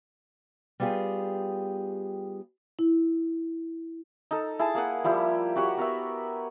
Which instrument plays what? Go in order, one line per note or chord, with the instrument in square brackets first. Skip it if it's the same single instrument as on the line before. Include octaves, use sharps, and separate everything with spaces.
[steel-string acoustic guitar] G3 B3 F4 G4 G#4
[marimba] E4
[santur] D#4 A4
E4 G#4 G#5 A5
A#3 G#4 F#5
F3 G3 E4 G4
F#4 G4 C#5 F#5
B3 A#4 B4 E5